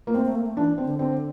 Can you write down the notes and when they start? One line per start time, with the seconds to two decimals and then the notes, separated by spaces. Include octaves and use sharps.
0.07 A#3
0.14 A3 C4
0.25 A3
0.35 A#3
0.46 A3
0.57 E3 D4
0.78 C4
0.85 D3
0.99 D3 C4